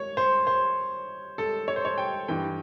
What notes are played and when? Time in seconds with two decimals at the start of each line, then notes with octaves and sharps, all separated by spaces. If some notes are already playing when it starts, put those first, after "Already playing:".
Already playing: C#5
0.17 C5
0.47 C5
1.38 A4
1.68 C#5
1.76 C5
1.85 C#5
1.98 G5
2.28 G2 E3 G5